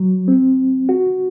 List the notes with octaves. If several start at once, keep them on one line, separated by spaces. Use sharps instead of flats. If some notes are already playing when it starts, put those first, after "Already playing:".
Already playing: F#3
C4
F#4